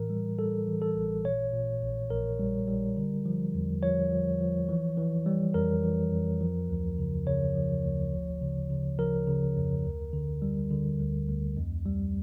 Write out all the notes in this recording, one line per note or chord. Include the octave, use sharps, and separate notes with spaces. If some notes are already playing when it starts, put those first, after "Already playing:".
Already playing: A2 E3 A#4
G3
G3 A4
E3
A4
A1
A#2 C#5
A#2
A#1
A#1 A#4
G3
G3
D3
F3
E2
F3 C#5
F3
F3
E3
E3
G3
F2 A#4
E3
F2
F3
D2
C#3
C#3 C#5
F3
D2
G1
C#3
C#3
F3 A#4
C#3
F2
D2
D3
G3
D3
D2
D2
F2
G3